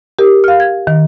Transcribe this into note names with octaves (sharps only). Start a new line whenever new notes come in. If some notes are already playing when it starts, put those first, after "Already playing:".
G4 A#4
F5 F6
G#6
D#3